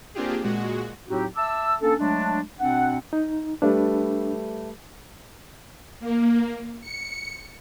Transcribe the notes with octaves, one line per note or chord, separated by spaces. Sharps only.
A#3 C4 D4 F4 G4 G#4
A#2 G#3 F#4
A2 F#3 C4 D#4 F#4 G4
E5 A5 D6 E6
A#3 C#4 D4 A4
F#3 G#3 A3 D4
B2 C4 D4 F#5
D#4
G3 A3 D4 B4
A#3
C#7